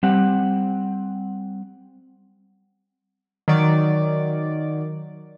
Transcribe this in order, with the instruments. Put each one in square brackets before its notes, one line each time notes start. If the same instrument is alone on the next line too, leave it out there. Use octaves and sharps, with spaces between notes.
[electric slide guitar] G3 C4 F#5
[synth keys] D#3 F#3 D5